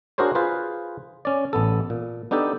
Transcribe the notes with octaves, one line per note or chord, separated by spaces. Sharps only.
D4 F#4 G#4 A#4 C5 C#5
F4 G#4 B4 C5
C#4 D5
A1 B3 A4
A#2
B3 D4 D#4 G4 A4